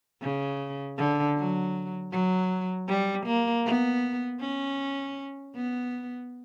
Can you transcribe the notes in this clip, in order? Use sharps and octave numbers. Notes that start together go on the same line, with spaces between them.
C#3
D3
F#3
F#3
G3
A#3
B3
C#4
B3